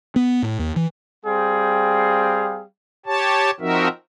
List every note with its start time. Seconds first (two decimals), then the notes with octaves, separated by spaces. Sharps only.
0.16 B3
0.42 A2
0.59 D#2
0.76 E3
1.25 G3 C4 G#4 F5 G5
3.06 G4 C#5 A5
3.60 F3 C4 D#4 F#4 A#4 E5